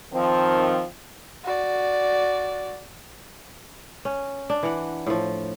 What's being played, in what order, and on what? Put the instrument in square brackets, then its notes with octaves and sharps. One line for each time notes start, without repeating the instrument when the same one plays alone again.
[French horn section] D#3 F3 C4
[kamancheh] F#4 D5
[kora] C#4
D4
E3 F#5
A2 F3